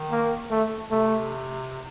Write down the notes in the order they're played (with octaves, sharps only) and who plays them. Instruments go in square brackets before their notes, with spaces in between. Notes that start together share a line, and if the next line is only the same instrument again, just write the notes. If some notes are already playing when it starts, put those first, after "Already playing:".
Already playing: [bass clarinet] D#3
[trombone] A#3
A3
[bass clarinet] C3 [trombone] A3